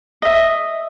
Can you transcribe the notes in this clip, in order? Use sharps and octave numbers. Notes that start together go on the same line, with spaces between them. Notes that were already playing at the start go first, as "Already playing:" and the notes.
D#5 E5